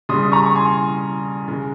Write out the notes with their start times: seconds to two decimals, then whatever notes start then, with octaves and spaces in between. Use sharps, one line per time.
0.09 C#3 G3 C6 D#6
0.32 A#5 C#6
0.46 C#6
0.56 G#5 C6
1.48 C#3 G#3